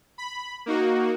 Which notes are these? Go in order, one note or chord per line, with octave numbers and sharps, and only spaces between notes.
B5
A#3 D#4 F#4